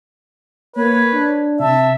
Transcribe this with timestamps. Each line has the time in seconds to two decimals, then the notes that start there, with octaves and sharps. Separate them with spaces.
0.76 A#3 B4 C#5
1.13 D4
1.60 C3 E5 A5